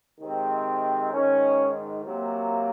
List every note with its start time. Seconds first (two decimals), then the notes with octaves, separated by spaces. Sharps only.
0.20 C3 D#3 G#3 C4
1.12 G#2 D#3 G#3 C#4
2.04 C3 F#3 A#3